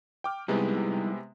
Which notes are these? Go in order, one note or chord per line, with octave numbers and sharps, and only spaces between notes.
G5 D6 F6
C3 G3 G#3 B3 D#4 E4